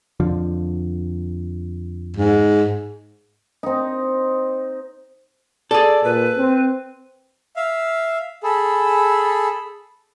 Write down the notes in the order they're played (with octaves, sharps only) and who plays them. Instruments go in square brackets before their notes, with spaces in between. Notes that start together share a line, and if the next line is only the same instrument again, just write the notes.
[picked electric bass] F2 D3 F3
[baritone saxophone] G#2
[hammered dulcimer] C4 D#4
[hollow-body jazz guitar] G#4 A4 [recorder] D5
[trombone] A#2 [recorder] B4
[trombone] C4
[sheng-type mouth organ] E5 F5
[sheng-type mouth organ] G#4 A4 [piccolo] B5